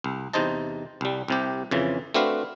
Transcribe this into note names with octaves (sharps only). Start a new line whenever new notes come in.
C2
E2 C3 D#4 C5 D#5 A5
C2 G3
C2 C3 G4
F2 C#3 E3
A3 C4 D4 F#4 B4 F5